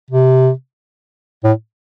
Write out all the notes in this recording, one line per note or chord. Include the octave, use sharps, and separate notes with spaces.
C3
A2